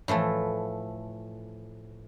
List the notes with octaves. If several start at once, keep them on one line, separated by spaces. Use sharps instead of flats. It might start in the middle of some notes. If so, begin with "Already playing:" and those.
A2 E3 F3 A3